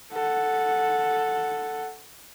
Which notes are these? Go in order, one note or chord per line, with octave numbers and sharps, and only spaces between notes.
A4 F#5